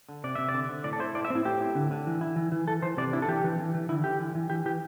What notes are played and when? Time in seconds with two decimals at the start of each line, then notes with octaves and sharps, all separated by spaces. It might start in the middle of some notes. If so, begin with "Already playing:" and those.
0.09 D3
0.24 C3 D5
0.35 C3 E5
0.49 D5
0.54 D3
0.69 D3
0.84 A2 D5
0.93 A4
1.00 E4 C5
1.15 A2 D5
1.25 E5
1.30 C4
1.35 E4
1.45 A2 G4
1.61 E4
1.75 D3
1.91 D3
2.07 E3
2.21 E4
2.36 E3
2.52 E3
2.68 E3 A4
2.82 E3 C5
2.97 C3 D5
3.13 D4 E4
3.22 A4
3.28 E3 G4
3.44 E3
3.59 E3
3.74 E3
3.89 D3 E4
4.04 D3 G4
4.20 E3
4.35 E3
4.50 E3 G4
4.65 E3 G4